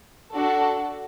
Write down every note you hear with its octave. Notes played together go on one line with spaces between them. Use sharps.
D4 F#4 A4